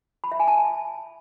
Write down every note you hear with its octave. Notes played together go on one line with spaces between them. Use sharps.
B5
E5
G#5
A5